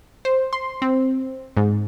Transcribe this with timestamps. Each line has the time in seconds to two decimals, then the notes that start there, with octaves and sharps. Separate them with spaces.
0.25 C5
0.53 C6
0.82 C4
1.57 G#2